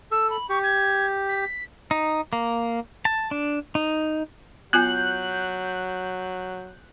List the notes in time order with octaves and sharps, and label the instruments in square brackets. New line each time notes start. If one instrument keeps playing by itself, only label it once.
[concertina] A4 [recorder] E6
[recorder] B5
[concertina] G4 [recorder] C#6
[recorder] G#6
B6
[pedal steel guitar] D#4
A#3
A5
D4
D#4
[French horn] F#3 [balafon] B3 F4 G#5 [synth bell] F#6 G6 F#7